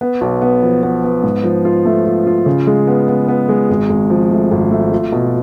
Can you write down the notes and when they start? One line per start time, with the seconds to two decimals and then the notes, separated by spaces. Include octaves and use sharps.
0.01 B3
0.21 B1
0.42 B3
0.63 F3
0.83 B3
1.04 B3
1.23 G#2
1.44 F3
1.65 F4
1.85 A3
2.06 F4
2.27 F4
2.46 C#3
2.67 G#3
2.87 B3
3.08 B3
3.28 B3
3.49 G#3
3.70 G#1
3.90 G#1
4.10 F3
4.31 A3
4.51 G#1
4.71 A3
4.92 F4
5.12 B2